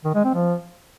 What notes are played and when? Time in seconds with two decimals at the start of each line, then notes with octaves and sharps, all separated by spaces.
0.05 D#3
0.15 G#3
0.24 C4
0.34 F3